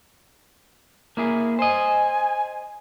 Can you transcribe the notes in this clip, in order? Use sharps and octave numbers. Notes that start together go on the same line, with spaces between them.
A#3 E4 G#4
C5 D#5 G#5